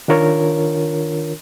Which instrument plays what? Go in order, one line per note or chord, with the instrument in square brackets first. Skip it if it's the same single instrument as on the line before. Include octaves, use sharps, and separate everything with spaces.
[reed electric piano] D#3 D4 F4 A#4 C#5